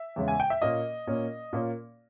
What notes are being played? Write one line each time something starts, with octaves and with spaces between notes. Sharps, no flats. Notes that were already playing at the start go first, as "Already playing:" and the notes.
Already playing: E5
E2 C#3 G#3 C#4
G#5
G5
E5
A#2 A#3 C#4 D#5
A#2 A#3 C#4
A#2 A#3 C#4